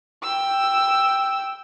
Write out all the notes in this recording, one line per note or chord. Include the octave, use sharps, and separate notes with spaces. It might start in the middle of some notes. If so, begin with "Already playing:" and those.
G5 E6